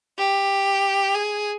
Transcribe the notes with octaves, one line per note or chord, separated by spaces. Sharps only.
G4
G#4